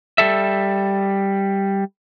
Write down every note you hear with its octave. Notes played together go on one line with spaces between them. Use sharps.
G3 A4 E5